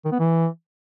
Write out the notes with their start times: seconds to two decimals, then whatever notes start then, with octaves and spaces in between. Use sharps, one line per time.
0.04 D#3
0.12 B3
0.19 E3